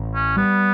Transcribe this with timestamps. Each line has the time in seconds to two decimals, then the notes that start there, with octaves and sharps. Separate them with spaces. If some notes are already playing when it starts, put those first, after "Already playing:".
Already playing: A1
0.15 C#4
0.37 G3 B3